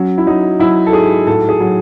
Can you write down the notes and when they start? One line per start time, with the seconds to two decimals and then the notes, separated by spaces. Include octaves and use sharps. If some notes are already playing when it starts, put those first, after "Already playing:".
Already playing: F#3 C#4
0.18 E4
0.27 F#3 D#4
0.60 F#3 E4
0.87 A4
0.93 G#2 G#4
1.26 A2 A4
1.49 G#4
1.60 F#3